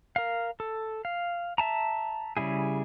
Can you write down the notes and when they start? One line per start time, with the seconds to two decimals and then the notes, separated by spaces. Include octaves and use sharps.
0.16 A#4 F5
0.60 A4
1.05 F5
1.58 E5 A5 A#5
2.37 C#3 G3 E4 G#4